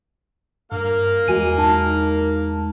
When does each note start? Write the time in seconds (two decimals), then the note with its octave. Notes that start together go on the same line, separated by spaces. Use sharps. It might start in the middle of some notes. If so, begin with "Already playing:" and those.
0.72 G2 A#3 A#4 F5
1.28 E2 G#3 F#4 G#5 D#7
1.58 D#4 A5